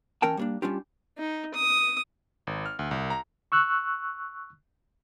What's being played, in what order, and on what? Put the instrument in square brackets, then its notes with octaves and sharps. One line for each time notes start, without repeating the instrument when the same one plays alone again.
[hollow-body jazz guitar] E3 C#4 A#4 G5 A5
G3 A#3 D4
G3 C#4 D4 F4 G4
[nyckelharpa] D#4
D#6
[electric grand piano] G#1
F6
D2
C2
A#5
[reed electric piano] C#6 E6 F#6